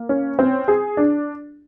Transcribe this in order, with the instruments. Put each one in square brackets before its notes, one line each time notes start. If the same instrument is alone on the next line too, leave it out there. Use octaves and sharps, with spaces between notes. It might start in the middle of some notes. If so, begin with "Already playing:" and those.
Already playing: [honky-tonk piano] A#3
C#4
C4
G#4
D4